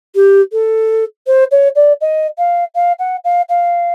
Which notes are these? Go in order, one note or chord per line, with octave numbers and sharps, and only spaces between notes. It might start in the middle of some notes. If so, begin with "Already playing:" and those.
G4
A4
C5
C#5
D5
D#5
F5
F5
F#5
F5
F5